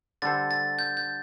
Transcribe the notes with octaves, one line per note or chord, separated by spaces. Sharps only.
D3 G3 D4 A4 C5 A6
A6
G6
G6